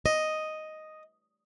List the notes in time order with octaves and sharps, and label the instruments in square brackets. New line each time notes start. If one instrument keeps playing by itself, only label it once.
[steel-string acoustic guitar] D#5